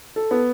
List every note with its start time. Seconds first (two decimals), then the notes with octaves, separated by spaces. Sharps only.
0.16 A4
0.31 B3